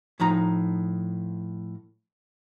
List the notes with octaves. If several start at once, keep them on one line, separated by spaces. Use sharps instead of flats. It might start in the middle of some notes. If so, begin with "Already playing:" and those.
A2 F3 D#4 A#5